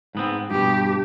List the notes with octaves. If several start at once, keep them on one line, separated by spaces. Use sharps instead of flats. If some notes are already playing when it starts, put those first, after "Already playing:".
G#2 B3 C4
G2 B2 G4